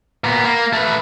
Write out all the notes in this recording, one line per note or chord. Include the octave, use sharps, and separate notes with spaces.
A#2 B3
A#3
A3 B4